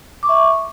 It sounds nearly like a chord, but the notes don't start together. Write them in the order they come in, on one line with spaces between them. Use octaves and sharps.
D6 C#6 E5